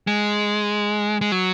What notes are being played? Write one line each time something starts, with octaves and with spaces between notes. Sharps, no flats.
G#3
G#3
F#3